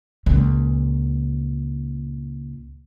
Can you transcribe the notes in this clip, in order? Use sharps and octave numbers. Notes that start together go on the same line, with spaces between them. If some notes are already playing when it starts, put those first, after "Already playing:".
C#2 A#2